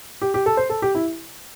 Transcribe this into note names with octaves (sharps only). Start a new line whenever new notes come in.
G4
G4
A4
C5
A4
G4
E4